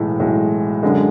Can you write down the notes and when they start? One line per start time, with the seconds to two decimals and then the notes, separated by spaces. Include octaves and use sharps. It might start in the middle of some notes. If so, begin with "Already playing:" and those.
Already playing: B1 A2 E3 G#3
0.19 B1 A2 E3 G#3
0.83 F#2 D3 G#3